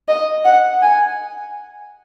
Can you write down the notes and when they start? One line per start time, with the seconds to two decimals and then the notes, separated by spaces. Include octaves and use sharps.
0.08 D#5
0.45 F#5
0.82 G#5